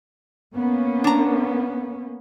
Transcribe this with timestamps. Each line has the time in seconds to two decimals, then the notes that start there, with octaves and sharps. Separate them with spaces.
0.54 A#3 B3 C#4
1.04 D4 A#5